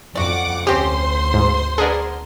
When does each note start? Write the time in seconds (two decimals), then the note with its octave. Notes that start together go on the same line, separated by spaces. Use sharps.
0.15 F2 F#4 D5 F#5 D6
0.67 D2 C4 C#4 G4 C5 C6
1.34 G#2
1.78 B3 D4 G#4 A#4 D5